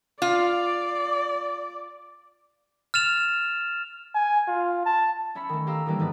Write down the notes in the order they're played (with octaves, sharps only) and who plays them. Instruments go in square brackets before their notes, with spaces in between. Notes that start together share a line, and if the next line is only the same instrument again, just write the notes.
[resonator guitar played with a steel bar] F4 [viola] D5
[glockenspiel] F6 A6 E7 F7
[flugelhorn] G#5
F4
A5
[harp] C#4 E5 B5 C#7
D#3 A3
G4 F5 A#5 E6
D#3 E3 G3 A#3 D4
G#2 B3 B4 D5 A6